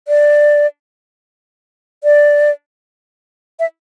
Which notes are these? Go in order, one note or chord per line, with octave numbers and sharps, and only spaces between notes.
D5
D5
E5